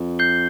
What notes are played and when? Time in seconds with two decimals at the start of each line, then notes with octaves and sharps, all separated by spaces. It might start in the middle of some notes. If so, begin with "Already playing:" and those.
Already playing: F2
0.19 G6 C7 G7